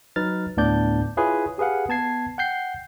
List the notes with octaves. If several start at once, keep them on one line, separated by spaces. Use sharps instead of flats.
F#3 D#4 B4 F6 A6
D2 A2 B3 D4 D5 G6
E4 F4 G#4 B4 C#5
G4 G#4 B4 F5 F#5
B3 A5 G#6 C7
F#5 G5 G6 C7